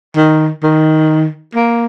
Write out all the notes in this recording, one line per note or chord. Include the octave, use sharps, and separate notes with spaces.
D#3
D#3
A#3